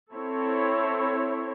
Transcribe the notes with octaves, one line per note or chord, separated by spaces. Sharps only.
C4 E4 A4 C#5